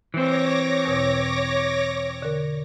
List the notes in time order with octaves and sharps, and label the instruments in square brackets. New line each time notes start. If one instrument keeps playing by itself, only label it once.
[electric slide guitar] E3 C4 [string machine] C#5 D6 A#6
[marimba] E2 B2
D3 A#4